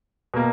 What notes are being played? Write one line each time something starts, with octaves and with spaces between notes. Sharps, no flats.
B2 A#3